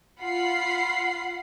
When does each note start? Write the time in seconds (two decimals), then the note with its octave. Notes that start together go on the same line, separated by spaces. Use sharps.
0.20 F4 F#5 B5 C7